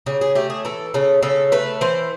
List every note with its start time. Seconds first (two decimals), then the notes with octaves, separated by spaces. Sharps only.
0.06 C#3 G4
0.21 G#4
0.35 A3 G4
0.50 G#4
0.65 E3 A4
0.94 C#3 A4
1.23 C#3 A4
1.52 A3 B4
1.81 E3 C5